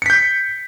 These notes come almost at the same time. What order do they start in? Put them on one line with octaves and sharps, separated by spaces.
C#7 B6 G6